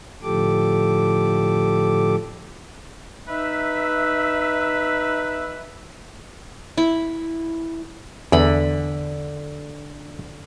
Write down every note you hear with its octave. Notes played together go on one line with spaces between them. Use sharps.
A2 D3 F3 G4 A4 D6
D#4 B4 E5
E4
E2 D3 B5